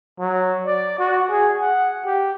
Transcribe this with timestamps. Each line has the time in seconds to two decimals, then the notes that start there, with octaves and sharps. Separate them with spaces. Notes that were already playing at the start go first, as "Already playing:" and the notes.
0.20 F#3
0.66 D5
0.99 F#4
1.30 G#4
1.59 F#5
2.06 G4